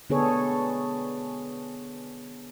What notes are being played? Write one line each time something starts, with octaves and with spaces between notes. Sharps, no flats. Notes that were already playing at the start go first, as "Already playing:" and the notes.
D3 B3 D4 G#4 A4 C#5